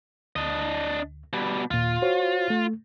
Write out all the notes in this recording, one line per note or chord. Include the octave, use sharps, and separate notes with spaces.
D2 D4 D#5
B2 G3
D#2 A#2 F4
F#4 C5 C#5
A3